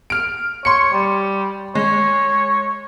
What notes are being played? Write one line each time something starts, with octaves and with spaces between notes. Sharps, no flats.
F6 D7
C#5 C6 C#7
G3
G#3 C#5